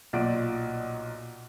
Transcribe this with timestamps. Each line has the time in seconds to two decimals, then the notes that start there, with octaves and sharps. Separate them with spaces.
0.13 B1 A#2 D5 D7